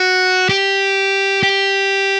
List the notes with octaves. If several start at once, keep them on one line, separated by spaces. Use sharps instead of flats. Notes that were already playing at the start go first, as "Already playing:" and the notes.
Already playing: F#4
G4
G4